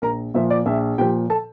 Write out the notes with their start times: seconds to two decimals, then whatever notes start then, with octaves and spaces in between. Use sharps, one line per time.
0.02 A#1 A#4 A#5
0.34 A#2 F3 E5
0.50 D5
0.66 A#1 E5
0.98 A#2 F3 G4 G5
1.30 A4 A5